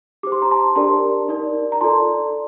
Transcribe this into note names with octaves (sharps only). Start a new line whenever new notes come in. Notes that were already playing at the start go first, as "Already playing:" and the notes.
G4 C5 D6
C6
A#5
A5 C6
D4 G4 A#4 D5 A5 C6
D#4 A#4 D5
A#5
F4 A4 D5 A5 C6